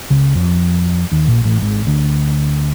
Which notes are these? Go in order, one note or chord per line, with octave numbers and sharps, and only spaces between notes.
C#2 C#3
F2 F3
D#2 D#3
A#1 A#2
A1 A2
G#1 G#2
D2 D3